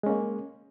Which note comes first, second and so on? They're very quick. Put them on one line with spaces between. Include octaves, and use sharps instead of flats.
G#3 C#4 A#3